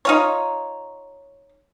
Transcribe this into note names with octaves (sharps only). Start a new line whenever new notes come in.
D#4 F4 C#5